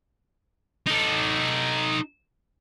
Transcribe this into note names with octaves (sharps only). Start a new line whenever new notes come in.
D#4 A4